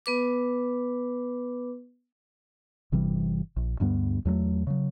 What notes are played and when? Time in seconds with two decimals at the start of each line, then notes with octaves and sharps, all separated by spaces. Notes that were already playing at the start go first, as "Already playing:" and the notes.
0.06 B3 B4 D6
2.92 G1 C3 E3 G3
3.56 A#1
3.80 D2 G2 G3 B3
4.25 E2 F#3 G3 A3
4.67 C#3 F#3